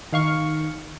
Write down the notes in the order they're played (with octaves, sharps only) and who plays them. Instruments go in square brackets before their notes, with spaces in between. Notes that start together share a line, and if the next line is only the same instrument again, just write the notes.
[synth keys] D#3 F5 C#6